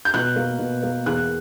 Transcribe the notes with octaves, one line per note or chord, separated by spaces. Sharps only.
G6
B2 F#6
A#3
B2
A#3
E2 F#6